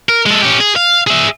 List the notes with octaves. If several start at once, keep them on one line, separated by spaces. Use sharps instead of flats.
A#4
G#3 A4
C#4 G4
G#4
F5
G#4 E5